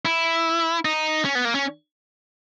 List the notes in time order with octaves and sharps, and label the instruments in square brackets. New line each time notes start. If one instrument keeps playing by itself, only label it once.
[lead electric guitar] E4
D#4
C#4
B3
A#3
C#4